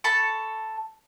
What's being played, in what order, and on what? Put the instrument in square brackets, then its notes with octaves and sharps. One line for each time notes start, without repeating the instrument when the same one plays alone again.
[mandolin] A4 A5 B5 C#6